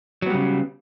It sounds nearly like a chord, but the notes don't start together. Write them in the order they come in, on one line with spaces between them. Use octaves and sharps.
F#3 B3 G3 C#3